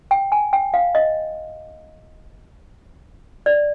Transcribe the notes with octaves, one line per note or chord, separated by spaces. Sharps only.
G5
G#5
G5
F5
D#5
D5